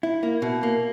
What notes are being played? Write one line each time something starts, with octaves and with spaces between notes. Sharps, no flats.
E4
A#3
B2
A#3